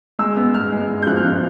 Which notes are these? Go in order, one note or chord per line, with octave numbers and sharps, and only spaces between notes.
G#3 E6
B3
G#3 F6
G#3
G#3
G6
F3 F#6
F6
F3 F#6